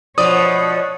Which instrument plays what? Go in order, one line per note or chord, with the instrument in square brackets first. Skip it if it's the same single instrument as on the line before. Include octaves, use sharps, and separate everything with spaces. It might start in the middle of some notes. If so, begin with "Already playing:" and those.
[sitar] B2 F3 D5 [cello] C#5 F#5 [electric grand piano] D#6